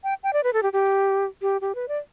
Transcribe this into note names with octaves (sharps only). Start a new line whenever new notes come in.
G5
G5
D5
B4
A4
G4
G4
G4
G4
B4
D5